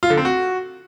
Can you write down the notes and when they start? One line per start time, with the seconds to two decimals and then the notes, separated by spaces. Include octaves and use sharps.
0.03 F4
0.10 D3
0.17 C4
0.25 F#4